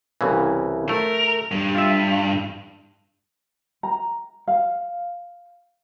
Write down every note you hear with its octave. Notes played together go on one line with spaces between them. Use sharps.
C2 C#3 E3
A3 A#4
G2
F4 E5
A#5
F5